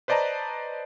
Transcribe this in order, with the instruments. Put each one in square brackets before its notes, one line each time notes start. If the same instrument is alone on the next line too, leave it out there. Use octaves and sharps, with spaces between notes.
[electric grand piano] B4 C5 D5 D#5 A5 A#5